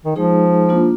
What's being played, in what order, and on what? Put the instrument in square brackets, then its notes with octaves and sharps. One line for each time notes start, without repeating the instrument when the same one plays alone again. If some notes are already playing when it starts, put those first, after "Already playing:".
[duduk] D#3
[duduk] F3 [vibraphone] G#3 D#4 G#4
[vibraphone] A#3 D4 F4